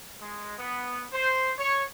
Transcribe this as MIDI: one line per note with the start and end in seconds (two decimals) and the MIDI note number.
0.21 0.53 56
0.58 1.06 59
1.13 1.52 72
1.58 1.82 73